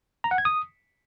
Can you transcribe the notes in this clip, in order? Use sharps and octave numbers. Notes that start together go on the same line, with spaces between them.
A#5
F#5
G#6
D#6